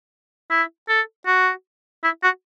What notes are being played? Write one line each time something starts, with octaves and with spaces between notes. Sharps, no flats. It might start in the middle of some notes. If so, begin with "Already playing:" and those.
E4
A4
F#4
E4
F#4